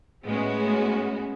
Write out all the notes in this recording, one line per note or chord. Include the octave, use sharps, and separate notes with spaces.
A2 G#3 B3 C#4 F#4